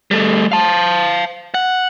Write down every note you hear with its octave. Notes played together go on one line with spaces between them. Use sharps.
G3 A3
F5 A5
F#5